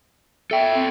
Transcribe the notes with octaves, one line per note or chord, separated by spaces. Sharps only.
A4 E5 G5
C4